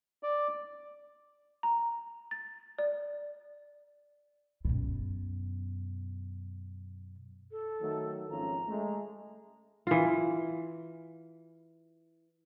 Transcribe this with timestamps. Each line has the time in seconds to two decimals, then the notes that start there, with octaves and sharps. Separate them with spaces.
0.23 D5
1.63 A#5
2.31 A6
2.79 D5
4.65 F#2 B2
7.51 A4
7.81 D#3 F#3 A3
8.30 G#1 F3 C#4 A#5
8.67 G#3 A3
9.87 E3 F4